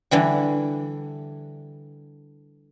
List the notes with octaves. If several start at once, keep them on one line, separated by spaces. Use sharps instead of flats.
D3 E3 G3